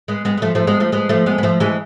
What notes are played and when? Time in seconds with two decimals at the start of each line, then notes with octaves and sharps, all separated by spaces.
0.08 G#3 B3
0.25 G#3 B3
0.38 G#3
0.42 F3 A3
0.55 F3 A3
0.67 G#3 B3
0.80 F3 A3
0.92 G#3 B3
1.09 F3 A3
1.26 G#3 B3
1.38 B3
1.43 F3 A3
1.60 E3 G#3